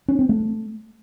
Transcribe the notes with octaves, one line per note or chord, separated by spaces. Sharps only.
C#4
C4
A3